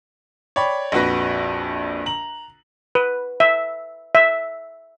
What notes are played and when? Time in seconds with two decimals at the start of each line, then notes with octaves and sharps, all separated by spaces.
0.56 C#5 D5 G5 B5
0.92 A#1 F2 F#4 B4 A#6
2.06 A#5 F#7
2.95 B4
3.40 E5
4.15 E5